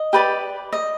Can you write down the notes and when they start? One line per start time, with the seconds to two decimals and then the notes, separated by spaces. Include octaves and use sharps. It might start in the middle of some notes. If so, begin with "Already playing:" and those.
Already playing: D#5
0.13 G4 B4 D5
0.73 D#5